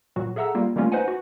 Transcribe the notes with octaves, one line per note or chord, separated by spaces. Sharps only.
A#2 F#3 F#4
G#4 A4 E5 F#5 A#5 E6
G3 A#3 F4
D#3 G3 A3 A#3 C#4 F4
D#4 B4 C5 D#5 F#5 G#5
F#4